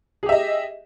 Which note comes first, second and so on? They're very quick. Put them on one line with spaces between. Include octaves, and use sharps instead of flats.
G#4 G4 E5 D#5